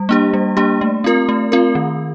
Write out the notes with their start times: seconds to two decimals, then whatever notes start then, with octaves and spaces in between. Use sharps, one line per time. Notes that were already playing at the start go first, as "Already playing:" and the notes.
Already playing: G3
0.09 A#3 D4 G4
0.33 G3
0.57 A#3 D4 G4
0.81 A3
1.04 C4 F4 A#4
1.29 A3
1.52 C4 F4 A#4
1.75 D#3